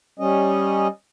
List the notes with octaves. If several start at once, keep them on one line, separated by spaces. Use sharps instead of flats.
G3 C#4 D#5